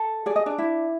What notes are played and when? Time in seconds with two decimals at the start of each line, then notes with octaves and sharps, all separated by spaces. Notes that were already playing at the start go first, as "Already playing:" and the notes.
Already playing: A4
0.26 G#4 D5
0.36 D#5
0.46 D4 D5
0.58 E4